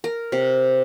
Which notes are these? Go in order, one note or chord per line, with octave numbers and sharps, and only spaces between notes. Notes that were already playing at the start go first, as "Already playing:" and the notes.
A#4
C3